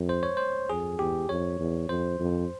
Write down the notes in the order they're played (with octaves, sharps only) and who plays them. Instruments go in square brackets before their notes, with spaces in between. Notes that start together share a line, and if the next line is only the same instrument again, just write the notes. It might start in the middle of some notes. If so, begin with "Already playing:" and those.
Already playing: [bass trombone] F2
[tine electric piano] C5
C#5
C5
[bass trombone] F2 [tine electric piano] G#4
[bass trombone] E2 [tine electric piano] G4
[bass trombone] F2 [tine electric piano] C#5
[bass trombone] E2
[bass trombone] F2 [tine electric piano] C5
[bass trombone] F2